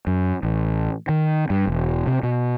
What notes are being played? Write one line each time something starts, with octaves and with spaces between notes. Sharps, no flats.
F#2
A1
D#3
G2
E1
C3
B2